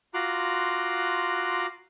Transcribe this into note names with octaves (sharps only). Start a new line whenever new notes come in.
F4 F#4 A#5 C6 D6 F#6